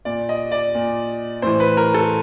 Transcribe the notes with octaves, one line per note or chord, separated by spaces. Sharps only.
A#2 D5
D#5
D5
A#2
A2 E3 C5
B4
A#4
A4